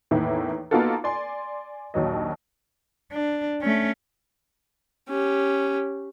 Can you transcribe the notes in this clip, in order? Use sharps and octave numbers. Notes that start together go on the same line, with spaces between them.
E2 A2 D#3 A#3 E4
A#3 B3 D#4 F4 F#4 A4
D5 G#5 C6
A#1 D#2 F#3 D#5
D4
A3 C#4
C#4 G4